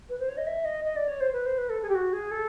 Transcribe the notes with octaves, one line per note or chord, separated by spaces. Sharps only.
B4
C5
C#5
D#5
E5
D#5
D#5
D5
C#5
C5
B4
C5
B4
A4
G#4
G4
F#4
G#4
A4